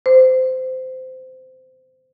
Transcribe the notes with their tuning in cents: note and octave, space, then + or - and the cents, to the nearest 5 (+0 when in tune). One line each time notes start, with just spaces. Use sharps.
C5 -20